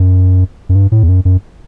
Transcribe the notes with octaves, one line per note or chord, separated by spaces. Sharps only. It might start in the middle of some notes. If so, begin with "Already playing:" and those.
Already playing: F#2
F#2
G2
A2
E2
F#2
F#2